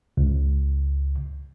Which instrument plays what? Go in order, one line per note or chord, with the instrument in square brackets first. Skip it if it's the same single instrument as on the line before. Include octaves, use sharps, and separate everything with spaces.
[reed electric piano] C#2